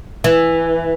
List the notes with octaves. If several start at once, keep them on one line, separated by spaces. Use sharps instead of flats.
E3